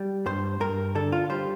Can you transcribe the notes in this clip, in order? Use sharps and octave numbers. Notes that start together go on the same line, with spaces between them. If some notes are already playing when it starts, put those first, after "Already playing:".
Already playing: G3
G2 C5
G2 A#4
D3 A4
F4
G3 C5